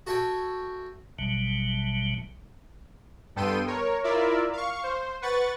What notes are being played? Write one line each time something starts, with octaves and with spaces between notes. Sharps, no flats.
F#4 A4 E5 G5 G#5
A1 B2 F#3 G3
G2 B3 A4 G5 C6 D#7
A#4 C#5
E4 F4 A#4 D5 E5
F5 C#6
C5
B4 F#5 C#6 A6